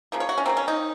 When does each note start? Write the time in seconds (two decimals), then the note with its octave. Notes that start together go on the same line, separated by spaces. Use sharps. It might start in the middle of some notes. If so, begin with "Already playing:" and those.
0.12 C#3 F3 A#3
0.20 C#5
0.29 F#4
0.38 C#4
0.45 C#3 F3 A#3 C4
0.57 C#4
0.68 D#4